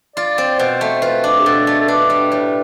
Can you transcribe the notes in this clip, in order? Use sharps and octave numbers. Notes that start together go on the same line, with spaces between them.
F4 D5
C4
B2 C5
A3
F4 B4
D4
G4
B2 A4
A3
A4
D4 B4
G3
A2